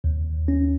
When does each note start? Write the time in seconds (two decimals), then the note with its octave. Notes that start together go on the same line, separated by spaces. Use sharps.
0.04 D#2
0.48 C#4